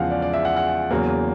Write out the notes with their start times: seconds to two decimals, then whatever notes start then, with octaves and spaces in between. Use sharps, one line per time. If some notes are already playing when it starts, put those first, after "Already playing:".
Already playing: E2 C#3 F3 G#3 F5 F#5
0.10 D5
0.22 D5
0.33 E5
0.45 F#5
0.56 F#5
0.91 E2 C#3 F#3 A#3